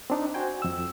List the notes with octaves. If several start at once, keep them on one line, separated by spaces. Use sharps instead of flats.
C4 D4 D#4
F#4 C5 G5 G#5
F2 E6